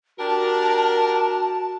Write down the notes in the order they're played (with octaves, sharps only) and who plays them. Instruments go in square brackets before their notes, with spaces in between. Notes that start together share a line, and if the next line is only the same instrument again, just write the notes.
[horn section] D4 G4 A#4 [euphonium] F#4 [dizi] A5